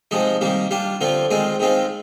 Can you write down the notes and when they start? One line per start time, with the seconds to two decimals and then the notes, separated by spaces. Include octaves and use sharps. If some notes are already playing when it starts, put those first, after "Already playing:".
0.11 C3 F3 G#3 D#4
0.41 C3 D#3 G3 A#3
0.71 G3 D4 F4
1.01 D3 F3 C4 F4
1.31 D#3 G#3 C4 F4
1.60 D#3 G#3 C4 F4